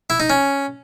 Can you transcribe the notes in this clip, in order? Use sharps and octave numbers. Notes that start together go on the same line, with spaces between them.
E4
D#4
C#4